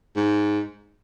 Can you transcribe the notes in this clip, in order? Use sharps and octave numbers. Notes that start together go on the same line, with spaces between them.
G#2